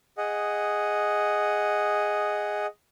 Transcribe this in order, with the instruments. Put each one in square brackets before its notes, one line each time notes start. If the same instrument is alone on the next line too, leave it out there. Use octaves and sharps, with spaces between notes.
[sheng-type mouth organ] G#4 D#5 F#5